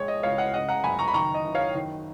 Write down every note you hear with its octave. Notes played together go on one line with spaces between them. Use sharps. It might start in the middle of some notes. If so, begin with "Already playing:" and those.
Already playing: A#1 G#3 C#5
D#5
C#2 C#5 F5
D#5 F#5
C#3 D#5 F#5
F#5 A#5
F#1 G#5 B5
A#5 C#6
B5
D#3 A#5 C#6
D#5
F#1
C#5 F5
D#3